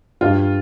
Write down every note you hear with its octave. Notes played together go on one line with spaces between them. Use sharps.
G2 F4